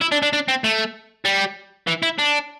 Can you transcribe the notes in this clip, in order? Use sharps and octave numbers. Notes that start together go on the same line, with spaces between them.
E4
D4
D4
D4
C4
A3
G3
E3
E4
D4